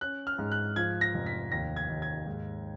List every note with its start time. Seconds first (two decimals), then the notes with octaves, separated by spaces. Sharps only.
0.01 C#4 F#6
0.27 F6
0.39 G#2
0.52 F#6
0.76 F3 G#6
1.01 A#6
1.14 F1
1.26 B6
1.51 D#2 A#6
1.76 G#6
1.89 D#2
2.02 G#6
2.26 G#2